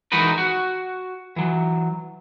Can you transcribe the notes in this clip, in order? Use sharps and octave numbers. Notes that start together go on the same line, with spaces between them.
E3 G#3 D#4 F#4 A#4 B4
F#4
E3 F#3